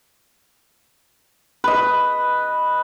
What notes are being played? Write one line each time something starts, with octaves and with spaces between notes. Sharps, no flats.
B4 D#5